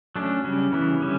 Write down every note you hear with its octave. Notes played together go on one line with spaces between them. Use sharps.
F#3 A3 C#4 D4
C#3 G3 C#4
C#3 E3 B3 E4
D3 G3 C#4